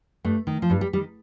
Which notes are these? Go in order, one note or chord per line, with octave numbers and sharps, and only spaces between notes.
G2 A3
D#3
F3
G2 G3
G3
D#3 G3